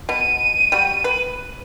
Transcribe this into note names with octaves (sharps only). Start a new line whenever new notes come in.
B2 D#7
G3 F#4
B4